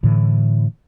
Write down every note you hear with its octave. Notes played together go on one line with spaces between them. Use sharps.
A2 D3 E3